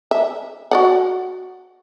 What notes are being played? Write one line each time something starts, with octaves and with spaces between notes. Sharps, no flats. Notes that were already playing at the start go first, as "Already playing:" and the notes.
E5
F#4 D5 F#5